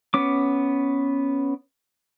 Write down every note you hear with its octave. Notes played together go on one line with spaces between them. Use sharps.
B3 C#4 D6